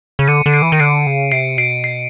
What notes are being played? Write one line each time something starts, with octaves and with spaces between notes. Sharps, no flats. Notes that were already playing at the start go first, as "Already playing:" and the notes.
C#3
D3 C#7 D#7
D3
C7 D7
E3
D#3
D3 C7 D7
C#3
C3 C7 D7
B2 C7 D7
C7